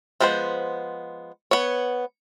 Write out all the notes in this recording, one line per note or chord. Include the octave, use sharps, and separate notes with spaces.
F3 G#3 B3 D4 C5
B3 C#5